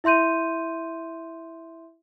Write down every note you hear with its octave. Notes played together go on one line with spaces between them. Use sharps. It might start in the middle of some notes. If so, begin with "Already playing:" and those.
E4 E5 C6 G6 D#7